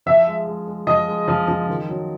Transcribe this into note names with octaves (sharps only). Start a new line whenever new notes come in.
F3 E5
G#3
G#3
G#3
F3 D#5
G#3
F3
F3
D#3
F#3